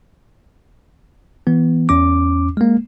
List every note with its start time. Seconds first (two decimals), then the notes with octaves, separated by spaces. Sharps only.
1.47 E3 B3
1.89 E2 C#4 D6
2.57 G#3 A#3